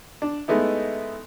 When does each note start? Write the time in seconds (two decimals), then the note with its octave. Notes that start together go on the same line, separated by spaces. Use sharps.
0.22 D4
0.48 G#3 A3 B3 D#4 E4